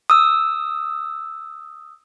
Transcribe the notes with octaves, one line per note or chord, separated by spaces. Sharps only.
D#6 E6